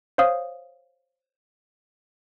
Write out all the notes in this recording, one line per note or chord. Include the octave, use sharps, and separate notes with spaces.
C5 C#5 F5 D#6